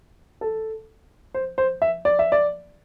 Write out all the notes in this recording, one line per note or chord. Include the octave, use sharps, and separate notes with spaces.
A4
C5
C5
E5
D5
E5
D5